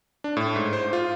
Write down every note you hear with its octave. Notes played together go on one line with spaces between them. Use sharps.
D4
A2
G#2
C5
F4